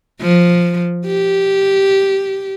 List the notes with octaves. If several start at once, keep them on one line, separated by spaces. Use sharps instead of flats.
F3
G4